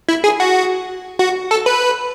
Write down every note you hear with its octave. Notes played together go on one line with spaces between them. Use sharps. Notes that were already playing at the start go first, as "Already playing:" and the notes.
E4
G#4
F#4
F#4
A4
B4